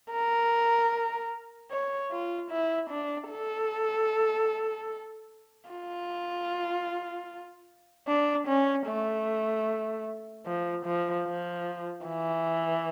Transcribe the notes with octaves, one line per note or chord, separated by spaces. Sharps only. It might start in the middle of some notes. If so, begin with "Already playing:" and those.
A#4
C#5
F4
E4
D4
A4
F4
D4
C#4
A3
F3
F3
F3
E3